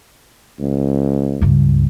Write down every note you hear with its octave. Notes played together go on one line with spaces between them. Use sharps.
C#2
C#2 G2